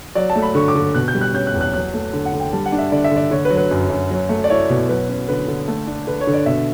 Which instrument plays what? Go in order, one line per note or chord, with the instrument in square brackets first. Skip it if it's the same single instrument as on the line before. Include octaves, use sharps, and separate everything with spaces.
[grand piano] F#3 D5
A5
A3
B5
D3 C#6
D6
D3
B2 F#6
G6
G3
F#6
C#4 G6
F#6
E2
F#6
F#3 F#6
A3
D3
F#5
D3
G5
G3 A5
F#5
D4
E5
D3 D5
E5
D3
D5
D3 C#5
B4
F#3
B4
F#2
F#2
F#3
A3
D5
E4 C#5
B2
F#3 B4
C#4
D3 B4
D3
A3 A4
D4
D3 B4
C#5
D3
D5
B2 E5